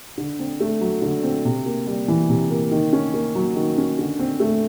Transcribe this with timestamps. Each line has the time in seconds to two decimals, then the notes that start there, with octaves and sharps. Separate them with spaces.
0.18 D3
0.39 C4
0.60 A3
0.81 F#3
1.02 D3
1.23 C4
1.45 C3
1.66 A#3
1.87 G3
2.08 E3
2.29 C3
2.50 A#3
2.71 D#3
2.93 C#4
3.14 A#3
3.35 F#3
3.55 D#3
3.78 C#4
3.98 D3
4.19 C4
4.40 A3